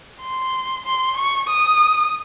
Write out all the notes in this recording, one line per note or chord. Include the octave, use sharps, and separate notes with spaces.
C6
C6
C#6
D#6